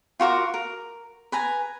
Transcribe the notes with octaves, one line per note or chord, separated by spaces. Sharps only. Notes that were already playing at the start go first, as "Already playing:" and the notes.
F4 F#4 A#4 D6
A#4
B4 G#5 A#5